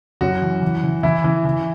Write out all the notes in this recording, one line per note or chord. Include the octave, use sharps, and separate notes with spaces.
F#2 F#4
E3
E3
E3
E3 E4
E3
E3